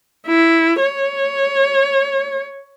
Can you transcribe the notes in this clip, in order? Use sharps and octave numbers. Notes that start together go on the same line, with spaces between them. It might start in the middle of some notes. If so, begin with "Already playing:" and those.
E4
C#5